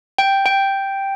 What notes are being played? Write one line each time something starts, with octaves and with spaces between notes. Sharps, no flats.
G5
G5